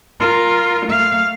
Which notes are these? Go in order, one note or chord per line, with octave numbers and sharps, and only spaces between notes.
F4 A#4
A3 F5